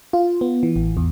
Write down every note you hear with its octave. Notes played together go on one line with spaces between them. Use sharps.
F4
B3
E3
A1
E2